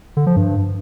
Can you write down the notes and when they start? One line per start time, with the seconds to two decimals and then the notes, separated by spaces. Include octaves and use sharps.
0.17 D3
0.27 F3
0.36 G2